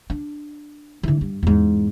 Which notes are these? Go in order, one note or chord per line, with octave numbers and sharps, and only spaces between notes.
D4
D3 E3
G2
E2 G#2